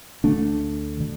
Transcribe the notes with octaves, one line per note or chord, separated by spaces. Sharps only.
D2 D3 A3 D4
D3